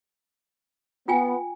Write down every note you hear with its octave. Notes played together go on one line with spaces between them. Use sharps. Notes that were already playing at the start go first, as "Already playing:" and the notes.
B3 F4 G5 G#5